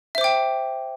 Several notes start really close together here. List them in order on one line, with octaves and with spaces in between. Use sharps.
E5 C5 D6 G5